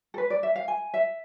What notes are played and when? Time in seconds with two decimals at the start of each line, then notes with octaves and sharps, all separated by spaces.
0.14 A4
0.18 B4
0.30 D5
0.43 E5
0.56 F5
0.68 G#5
0.94 E5